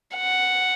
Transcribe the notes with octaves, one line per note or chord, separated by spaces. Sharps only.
F#5